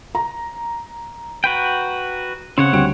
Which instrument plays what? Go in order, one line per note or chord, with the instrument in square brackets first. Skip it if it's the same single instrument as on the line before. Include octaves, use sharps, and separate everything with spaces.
[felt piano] A#5
[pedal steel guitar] F#4 B4 G5
[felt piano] C#3 [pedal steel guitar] C4 C#5 F#5
[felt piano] D2 G3 D7